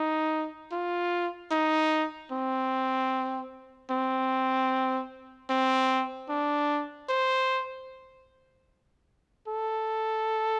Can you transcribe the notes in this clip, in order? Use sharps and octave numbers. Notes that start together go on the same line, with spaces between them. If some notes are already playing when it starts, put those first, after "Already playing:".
Already playing: D#4
F4
D#4
C4
C4
C4
D4
C5
A4